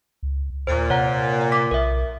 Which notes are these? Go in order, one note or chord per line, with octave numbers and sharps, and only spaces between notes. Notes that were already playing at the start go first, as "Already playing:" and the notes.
C#2
D#2 A#2 C5
C3 C#5 F#5 A#5
D6 B6
B1 A#4 E5